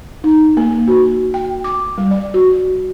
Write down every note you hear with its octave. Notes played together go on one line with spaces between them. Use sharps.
D#4
A#3
F#4
G5
D6
G3
D5
F#4